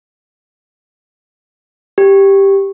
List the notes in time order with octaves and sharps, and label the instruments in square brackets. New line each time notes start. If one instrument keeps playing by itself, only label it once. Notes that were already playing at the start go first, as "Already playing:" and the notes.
[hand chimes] G4